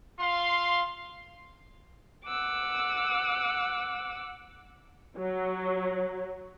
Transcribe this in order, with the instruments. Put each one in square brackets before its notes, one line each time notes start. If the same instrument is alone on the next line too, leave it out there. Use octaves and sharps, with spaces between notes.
[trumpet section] F4 F5 C6
[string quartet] F#5 D6 E6
[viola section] F#3